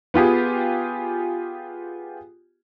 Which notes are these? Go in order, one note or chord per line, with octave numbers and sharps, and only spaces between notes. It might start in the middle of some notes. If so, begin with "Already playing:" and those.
B3 F4 G4 G#4